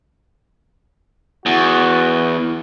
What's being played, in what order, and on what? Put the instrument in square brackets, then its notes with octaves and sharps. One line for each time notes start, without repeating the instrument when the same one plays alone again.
[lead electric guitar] E2 [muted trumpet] F#4